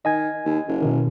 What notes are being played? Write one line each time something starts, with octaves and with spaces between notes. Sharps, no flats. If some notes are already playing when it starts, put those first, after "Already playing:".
D#3 D#5 G#5 G#6
D#2
F#1
B2 D#3